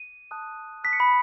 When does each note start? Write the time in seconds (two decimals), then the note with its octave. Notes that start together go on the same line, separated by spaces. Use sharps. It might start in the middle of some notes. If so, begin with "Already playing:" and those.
Already playing: D#7
0.31 A5 D#6 F#6
0.84 A5 D#6 F#6 B6
0.93 C#7
1.00 B5 B6